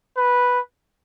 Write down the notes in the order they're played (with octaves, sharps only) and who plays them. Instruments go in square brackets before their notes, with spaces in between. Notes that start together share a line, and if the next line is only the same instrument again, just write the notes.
[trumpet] B4